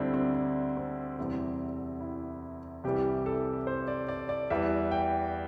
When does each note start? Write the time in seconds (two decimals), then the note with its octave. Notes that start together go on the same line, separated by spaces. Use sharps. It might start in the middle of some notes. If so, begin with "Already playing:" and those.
Already playing: D2 D3 G3 C4 D4 E4
0.14 C4
0.35 D4
0.77 C4
1.19 E2 C3 E3 G3
2.01 E4
2.84 C2 C3 E3 G3 G4
3.26 A4
3.67 C5
3.88 D5
4.08 D5
4.29 D5
4.50 E2 E3 G3 E5
4.91 G5